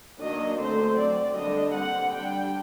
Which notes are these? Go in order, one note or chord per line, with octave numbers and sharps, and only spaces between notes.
D#3 F#3 A#3 D4 D#5
D3 A3 C4 C5
F#3 C4 D5
D3 G3 A#3 D4 D#5
D3 G3 C4 F#5
G3 D4 G5